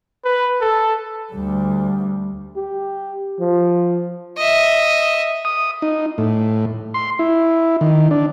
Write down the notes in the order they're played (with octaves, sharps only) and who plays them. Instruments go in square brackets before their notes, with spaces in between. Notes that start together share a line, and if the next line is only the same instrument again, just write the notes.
[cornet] B4
A4
[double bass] D2 G3
[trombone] G4
F3
[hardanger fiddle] D#5 E5
[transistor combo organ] D#6
D#4
A2
C6
E4
D#3
D4